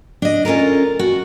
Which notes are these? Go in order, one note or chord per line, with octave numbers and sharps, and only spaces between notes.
D4 D#5
C#4 F4 A4 A#4
F#4